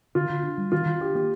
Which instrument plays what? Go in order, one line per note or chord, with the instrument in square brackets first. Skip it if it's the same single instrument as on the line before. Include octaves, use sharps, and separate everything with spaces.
[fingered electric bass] D3 [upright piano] F4
[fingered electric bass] D3
D4
G3
[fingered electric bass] D#3 [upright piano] F4
[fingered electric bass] D#3
[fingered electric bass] D4 [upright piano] G4
[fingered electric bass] A#3 [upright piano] G4